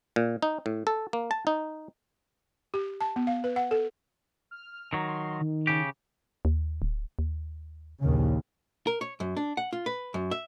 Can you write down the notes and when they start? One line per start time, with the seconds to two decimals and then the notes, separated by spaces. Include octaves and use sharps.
0.16 A#2
0.42 D#4
0.66 A2
0.87 A4
1.13 A#3
1.31 A5
1.47 D#4
2.74 G4
3.01 A5
3.16 B3
3.27 F5
3.44 B4
3.56 F#5
3.71 A4
4.51 F6
4.93 D#3 F#3 A#5
5.08 C6
5.41 D#3
5.67 C#3 G4
6.45 D#2
6.82 D1
7.19 D#2
8.01 A#1 D#2 C#3
8.87 A#4
9.01 C#5
9.20 F#2
9.37 D4
9.57 F#5
9.73 F4
9.86 B4
10.14 F#2
10.31 E5